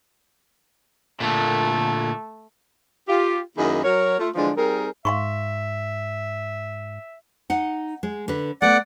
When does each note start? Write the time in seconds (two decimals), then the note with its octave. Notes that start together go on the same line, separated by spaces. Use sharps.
1.20 A#2 D3 A3
3.08 F4 G4
3.57 F#2 D#3 A#3 E4 G#4 D#5
3.83 F#3 A#4 C#5
4.18 A3 F4
4.35 D3 E3 F3 G#3 D4
4.56 G3 C4 D#4 G#4 A#4
5.05 G#2 E5 F5 C6 C#6
7.50 D#4 F#5
8.03 G#3
8.28 D3 B4
8.62 A3 B3 D5 F#5